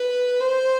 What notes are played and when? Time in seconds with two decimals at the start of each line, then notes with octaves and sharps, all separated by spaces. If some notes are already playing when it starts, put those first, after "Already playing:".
Already playing: B4
0.40 C5